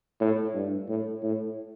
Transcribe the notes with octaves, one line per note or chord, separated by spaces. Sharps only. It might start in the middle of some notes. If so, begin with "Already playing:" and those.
A2
G2
A2
A2